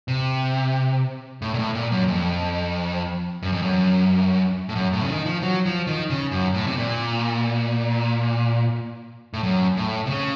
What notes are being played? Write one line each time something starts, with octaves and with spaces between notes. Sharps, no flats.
C3
A2
A#2
A2
A#2
F#2
F2
F#2
F2
F#2
A2
F#2
A2
C#3
D#3
F3
F#3
F3
D#3
C#3
F#2
A2
C3
A#2
A2
F#2
A2
C3
C#3